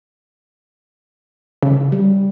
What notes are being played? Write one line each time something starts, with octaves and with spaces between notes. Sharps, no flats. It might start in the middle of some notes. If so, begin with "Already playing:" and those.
C#3
G3